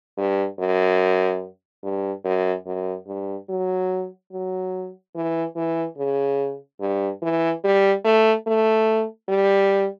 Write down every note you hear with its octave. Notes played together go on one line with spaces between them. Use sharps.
G2
F#2
G2
F#2
F#2
G2
F#3
F#3
E3
E3
C#3
G2
E3
G3
A3
A3
G3